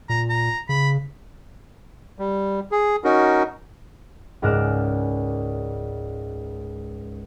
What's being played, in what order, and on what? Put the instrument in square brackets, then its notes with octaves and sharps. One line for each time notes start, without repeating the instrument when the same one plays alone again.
[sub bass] A#2 [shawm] A#5
[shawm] A#5
[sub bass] C#3 [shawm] B5
[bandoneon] G3
G#4
C#4 D#4 F#4 A#4
[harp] C#2 G#2 A#4 D5 F#6 E7